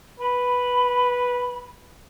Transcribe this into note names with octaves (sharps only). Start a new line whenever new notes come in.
B4 B5